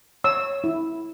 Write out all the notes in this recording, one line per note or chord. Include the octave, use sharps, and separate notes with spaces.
C#5 E6
E4